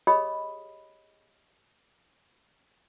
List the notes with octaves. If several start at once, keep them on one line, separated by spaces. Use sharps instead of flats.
G4 G#4 C#5 D#5 B5 D#6